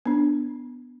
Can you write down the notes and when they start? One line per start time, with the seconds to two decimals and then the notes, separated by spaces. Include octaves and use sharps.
0.06 B3 D4